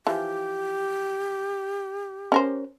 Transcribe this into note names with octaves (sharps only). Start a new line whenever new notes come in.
E3 F3 G4
C#4 A#4 C5